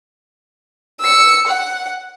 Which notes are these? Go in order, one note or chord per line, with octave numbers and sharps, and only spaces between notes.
E6 C#7
F#5